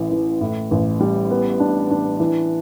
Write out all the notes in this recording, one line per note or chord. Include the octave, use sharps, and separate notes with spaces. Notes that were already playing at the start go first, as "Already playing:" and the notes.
Already playing: A1 E3
E3
A2
A1
G3
B3
D4
D4
E3